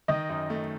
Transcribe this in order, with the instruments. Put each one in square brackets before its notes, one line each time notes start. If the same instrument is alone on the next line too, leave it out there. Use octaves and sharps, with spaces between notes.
[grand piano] D#3 [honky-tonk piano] D#5
[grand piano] F#2
A3